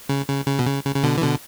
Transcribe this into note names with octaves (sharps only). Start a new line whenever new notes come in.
C#3
C#3
C#3
B2
C#3
C#3
C#3
B2 D3
E3
B2 D3